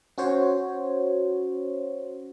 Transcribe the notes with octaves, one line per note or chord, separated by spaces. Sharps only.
C#4 F#4 C5 C#5